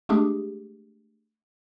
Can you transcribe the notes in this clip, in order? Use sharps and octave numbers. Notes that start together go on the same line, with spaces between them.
G#3 A3 D4 G4 G#4